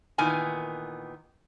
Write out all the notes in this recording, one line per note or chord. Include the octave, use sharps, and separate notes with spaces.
A#2 D#3 E3 B3 G#5